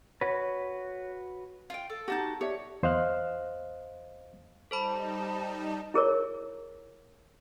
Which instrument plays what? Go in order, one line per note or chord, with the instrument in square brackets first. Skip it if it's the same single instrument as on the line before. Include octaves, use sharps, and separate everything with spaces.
[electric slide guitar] F#4 B4 [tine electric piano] C#5
[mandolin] F4 G5
A4
[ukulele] D#4 G4 [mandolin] F#4 A5 G6
[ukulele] G4 D5 E5 [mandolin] C#5
[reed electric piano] E2 C5 D#5 F5 F6 F#6
[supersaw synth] G3 D#4 [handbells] A4 C5 B5 [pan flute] A5
[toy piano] E4 G#4 A#4 C#5